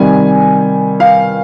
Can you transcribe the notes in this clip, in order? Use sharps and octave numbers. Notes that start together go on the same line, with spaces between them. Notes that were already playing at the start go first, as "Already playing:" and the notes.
Already playing: C3 D#3 G3 G#5
F5